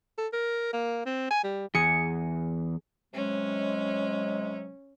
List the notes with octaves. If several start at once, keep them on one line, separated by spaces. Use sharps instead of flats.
A4
A#4
A#3
C4
G#5
G3
E2 G#4 C#7
C3 F#3 G#3 C#4